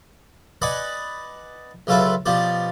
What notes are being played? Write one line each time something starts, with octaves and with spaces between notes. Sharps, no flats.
B4 D5 D#5 F#5 G#5 B5
C#2 F#3 F4 A4 B4 E5
B2 F3 G4 D5